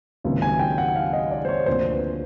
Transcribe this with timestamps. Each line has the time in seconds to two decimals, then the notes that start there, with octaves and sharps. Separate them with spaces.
0.24 C#2 C3 D#3 F#3 A#3
0.42 G#5
0.59 G5
0.78 F#5
0.96 F5
1.13 D#5
1.31 D5
1.45 C5
1.49 C#5
1.66 D2 C3 F3 A#3 C5
1.91 B4